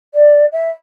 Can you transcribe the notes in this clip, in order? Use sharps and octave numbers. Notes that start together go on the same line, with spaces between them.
D5
E5